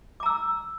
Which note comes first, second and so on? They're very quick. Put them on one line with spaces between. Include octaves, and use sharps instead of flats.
D6 A#5 E6